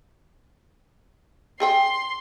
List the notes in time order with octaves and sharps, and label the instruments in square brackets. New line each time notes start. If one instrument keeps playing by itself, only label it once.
[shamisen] G4 G#4 G5 [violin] C6